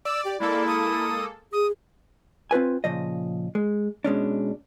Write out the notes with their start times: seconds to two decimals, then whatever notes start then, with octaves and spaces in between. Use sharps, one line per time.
0.05 D5 E6
0.25 G4
0.40 G#3 A#3 E4 A4 D5
0.67 D#6
1.53 G#4 D#6
2.51 C4 F4 B4 G#5
2.84 A#2 C#3 F3 D#5
3.55 G#3
4.04 B2 G#3 C#4 D4